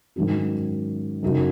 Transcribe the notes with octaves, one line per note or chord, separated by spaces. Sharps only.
G#2 D#3 F#3 C#4 F#4
F#2 C#3 F#3 D#4 F#4